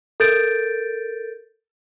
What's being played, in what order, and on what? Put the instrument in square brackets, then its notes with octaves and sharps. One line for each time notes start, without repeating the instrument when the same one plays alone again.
[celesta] A4 A#4 G6 A6 D7